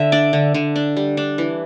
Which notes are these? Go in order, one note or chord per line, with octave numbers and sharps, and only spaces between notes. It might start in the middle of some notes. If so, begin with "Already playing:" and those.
Already playing: D3 E5
D4 D5
D3
D3
D4
G3
D4
E3